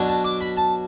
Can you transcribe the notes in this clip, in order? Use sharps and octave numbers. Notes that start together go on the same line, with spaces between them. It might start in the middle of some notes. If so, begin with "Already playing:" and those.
Already playing: B2 F#3 D4
A5
D6
B5
A5